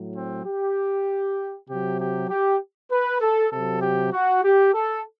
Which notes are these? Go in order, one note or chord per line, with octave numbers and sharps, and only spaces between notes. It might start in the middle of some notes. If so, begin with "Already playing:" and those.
Already playing: A2 F#3
C4
G4
C3 F#3 G4
G4
G4
B4
A4
C3 F#3 A4
G4
F#4
G4
A4